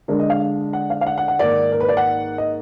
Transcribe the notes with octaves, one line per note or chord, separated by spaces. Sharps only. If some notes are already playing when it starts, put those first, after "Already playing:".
D3 G#3 D4 A#4
D#5
F5
F#5
F5
F5
F#5
F#5
F#5
G#2 D#3 A#3 D5
A#4
B4
D5
F#5
D#5